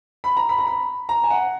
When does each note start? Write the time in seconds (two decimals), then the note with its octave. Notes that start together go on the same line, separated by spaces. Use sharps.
0.24 B5
0.37 A#5
0.49 B5
0.58 A#5
0.67 B5
1.09 A#5
1.24 G#5
1.30 F#5